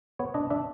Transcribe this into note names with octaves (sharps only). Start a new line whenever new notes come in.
B3 C#5
D4 D#5
D4 E5